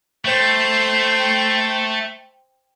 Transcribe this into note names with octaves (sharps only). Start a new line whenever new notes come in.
A3 C5 G5